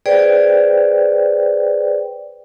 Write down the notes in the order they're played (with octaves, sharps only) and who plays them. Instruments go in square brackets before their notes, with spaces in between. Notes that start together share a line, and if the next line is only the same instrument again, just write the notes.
[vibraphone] G#4 B4 C5 D5 G5